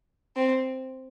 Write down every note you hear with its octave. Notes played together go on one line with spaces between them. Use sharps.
C4